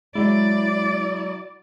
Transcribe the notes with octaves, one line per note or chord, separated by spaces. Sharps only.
F#3 G#3 E4 D5